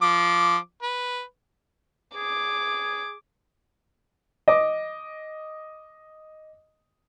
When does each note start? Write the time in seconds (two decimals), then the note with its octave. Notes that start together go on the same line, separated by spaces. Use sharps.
0.02 F3 D6
0.83 B4
2.16 G#4 D6
4.48 D#5 D6